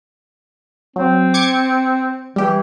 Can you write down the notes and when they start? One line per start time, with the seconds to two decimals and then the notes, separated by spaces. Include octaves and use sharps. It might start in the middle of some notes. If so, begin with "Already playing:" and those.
0.96 F#3 C4
1.34 D6 G#6 C#7
2.36 E3 G3 G4